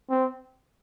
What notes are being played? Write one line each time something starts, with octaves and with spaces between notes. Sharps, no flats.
C4